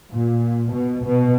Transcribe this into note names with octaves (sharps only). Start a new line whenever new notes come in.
A#2
B2
B2